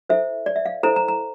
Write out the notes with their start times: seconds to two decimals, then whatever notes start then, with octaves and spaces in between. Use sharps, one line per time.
0.09 E4 A4 C5 E5
0.46 D5
0.56 E5
0.66 F5
0.83 E4 A4 C5 A#5
0.96 A#5
1.08 A#5